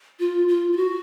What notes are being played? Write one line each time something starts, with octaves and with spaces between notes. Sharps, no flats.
F4
F4
F4
F#4